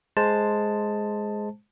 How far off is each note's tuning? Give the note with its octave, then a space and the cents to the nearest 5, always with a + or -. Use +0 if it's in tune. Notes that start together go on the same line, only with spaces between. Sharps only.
G#3 +10 C5 +0 A5 +5